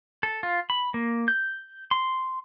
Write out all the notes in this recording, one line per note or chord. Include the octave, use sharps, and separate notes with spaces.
A4
F4
B5
A#3
G6
C6